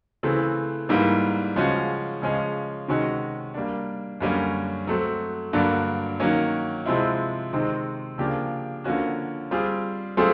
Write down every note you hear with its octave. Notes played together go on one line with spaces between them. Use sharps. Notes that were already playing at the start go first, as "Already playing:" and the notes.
C#3 E3 A3 C4
G#2 E3 G3 A#3
C#3 F3 G#3 C#4 F#4
C#3 F3 G#3 C#4
C3 D#3 G#3 C#4 F#4
G3 A#3 D4
F#2 D3 G3 A#3 C#4
F#3 A3 C4
G2 D3 F#3 A#3 D4
D#3 F#3 A#3 C#4
C3 F3 G#3 C4 E4
C3 D#3 G#3 C4
C#3 F3 A#3 D4 G4
D3 F3 A#3 C#4 F#4
G3 C4 F4 G#4
F#3 A3 C4 F4 G#4